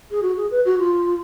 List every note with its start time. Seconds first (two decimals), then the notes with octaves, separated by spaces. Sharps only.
0.11 G#4
0.22 F#4
0.37 G#4
0.51 B4
0.65 F#4
0.79 F4